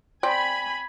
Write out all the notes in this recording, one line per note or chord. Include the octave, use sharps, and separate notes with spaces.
C4 D5 G5 G#5 B5